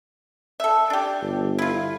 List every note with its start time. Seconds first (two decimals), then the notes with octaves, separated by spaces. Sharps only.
0.60 A4 E5
0.90 D4 G4
1.22 G1
1.59 E4 F4